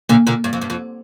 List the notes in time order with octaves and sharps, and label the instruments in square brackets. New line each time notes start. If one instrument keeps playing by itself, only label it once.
[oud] A#2 D3 [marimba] A#3
[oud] A#2 D3
G2
F2
G2
F2